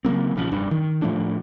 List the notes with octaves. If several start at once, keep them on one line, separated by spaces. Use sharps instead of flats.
C#3 F#3 A#3 C4
A#1 C#3 F3
F1 G2 D4
D#3
A2 F3 A3 D4